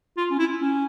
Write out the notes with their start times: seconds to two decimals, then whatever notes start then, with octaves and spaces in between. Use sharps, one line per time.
0.17 F4
0.31 C#4
0.39 E4
0.61 C#4